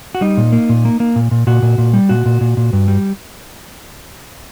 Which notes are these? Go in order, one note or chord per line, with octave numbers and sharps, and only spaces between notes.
F#4
G3 D#4
A#2
A#3
A#2
A#3
A#3
A#2
A#2
A#2 F#4
A#2
A#2
G3
A#2 F#4
A#2
A#2
A#2
G2
G3